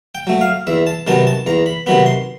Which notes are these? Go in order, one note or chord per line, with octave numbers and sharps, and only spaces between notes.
G5
F#3 A3
F5
E2 E5
A5
C3 D#3 F#3 B3 A5
A5
E2 A#5
B5
C3 D#3 F#3 B3 B5
C6